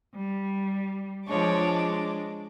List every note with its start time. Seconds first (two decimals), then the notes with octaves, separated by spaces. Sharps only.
0.14 G3
1.28 F3 G#3 D4 C#5 D6
1.66 G#3